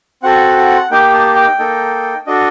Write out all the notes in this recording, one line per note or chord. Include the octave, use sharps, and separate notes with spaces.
C4 F#4 A4 F#5
F#5
A#3 D#4 G4 G5
A5
G5
A#3 D#4 A4
D4 F#4 A4 D#5